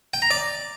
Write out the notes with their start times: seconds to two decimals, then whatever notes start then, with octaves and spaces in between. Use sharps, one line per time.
0.14 G5
0.22 A#5
0.31 D5